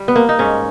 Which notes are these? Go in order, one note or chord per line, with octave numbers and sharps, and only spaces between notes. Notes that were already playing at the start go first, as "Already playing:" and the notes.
Already playing: G3
B3
A#3
D#4
G#2 C#4